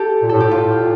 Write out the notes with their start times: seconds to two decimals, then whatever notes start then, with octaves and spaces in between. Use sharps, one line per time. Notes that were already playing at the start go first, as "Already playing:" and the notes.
Already playing: G4 A4
0.22 A#2
0.29 A2 A4
0.40 A2 G4
0.51 F4
0.65 A2
0.80 A#2